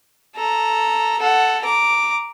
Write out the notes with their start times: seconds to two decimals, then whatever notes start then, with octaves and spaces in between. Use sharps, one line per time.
0.36 A4 A#5
1.19 A4 F#5
1.63 A#5 D6